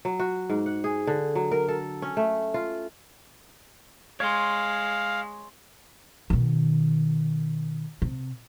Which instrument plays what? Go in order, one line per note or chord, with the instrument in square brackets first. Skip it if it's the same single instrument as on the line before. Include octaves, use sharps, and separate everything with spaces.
[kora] F#3
F#4
G#2
F#5
G#4
D3
F#3
A#4
A4
C#4
A3
F4
[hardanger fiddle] G#3 [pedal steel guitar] C#5 C6 [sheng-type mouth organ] F5
[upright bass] B2 D#3
C3